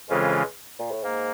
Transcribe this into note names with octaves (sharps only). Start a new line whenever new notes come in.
F2 C#3 E3 G#3 C#4 F4
A#2
A2
G#2 A#3